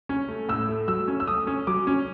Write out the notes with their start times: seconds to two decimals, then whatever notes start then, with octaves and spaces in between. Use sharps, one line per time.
0.09 C#4
0.28 A3
0.49 A2 E6
0.69 A3
0.88 F#3 E6
1.08 C#4
1.20 E6
1.27 A3 D#6
1.47 C#4
1.67 F#3 D6
1.87 C#4